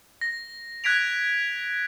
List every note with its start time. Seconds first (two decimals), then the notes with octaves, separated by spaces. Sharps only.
0.21 A#6
0.84 F#6 G#6 B6 D7 F7